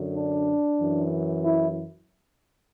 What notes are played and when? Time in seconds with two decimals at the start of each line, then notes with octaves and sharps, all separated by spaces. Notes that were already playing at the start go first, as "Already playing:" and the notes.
Already playing: F#2 D3
0.15 D4
0.80 F#2 E3
1.45 E4